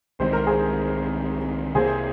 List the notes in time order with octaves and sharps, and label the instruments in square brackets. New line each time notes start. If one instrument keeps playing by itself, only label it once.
[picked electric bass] C2 C3 D#3 G#3 [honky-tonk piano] C5
[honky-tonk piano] A#4
G#4 C5
[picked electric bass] C2 C3 F3 A#3 [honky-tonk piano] G#4 C5